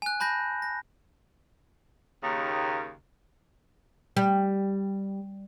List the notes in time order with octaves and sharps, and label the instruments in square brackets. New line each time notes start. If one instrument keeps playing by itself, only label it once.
[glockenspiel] G#5 F#6
A5 B5 G6 A#6
A#6
[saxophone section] D#2 C#3
[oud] G3